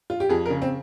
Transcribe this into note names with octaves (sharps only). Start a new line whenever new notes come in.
F4
G4
F2 G#4
A#4
C#3
C4